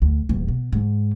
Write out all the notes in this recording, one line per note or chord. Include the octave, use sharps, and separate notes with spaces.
D2
D#1 E2
B2
G#2 D#3